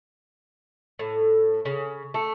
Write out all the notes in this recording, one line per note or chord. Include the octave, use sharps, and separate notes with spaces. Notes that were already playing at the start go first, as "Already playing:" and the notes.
A2
C#3
A3